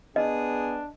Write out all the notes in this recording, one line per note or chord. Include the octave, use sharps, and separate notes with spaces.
B3 D4 G#4 D#5